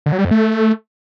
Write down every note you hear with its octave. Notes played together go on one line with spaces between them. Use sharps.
D3
F#3
G3
F2
A3